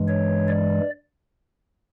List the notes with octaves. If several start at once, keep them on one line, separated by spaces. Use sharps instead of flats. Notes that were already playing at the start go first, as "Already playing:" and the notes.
Already playing: G2 E3 G#3
C#5
D5